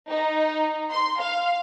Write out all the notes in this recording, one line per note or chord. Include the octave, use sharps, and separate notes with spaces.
D#4
C6
F5